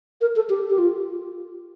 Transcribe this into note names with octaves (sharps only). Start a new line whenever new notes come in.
A#4
A4
G4
G4
F4